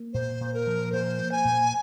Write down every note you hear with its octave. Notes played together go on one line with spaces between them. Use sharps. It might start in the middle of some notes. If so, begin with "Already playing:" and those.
Already playing: A#3
A#2 C5
A#2
A#4
F3
A#2 C5
A#3
G#5
A#2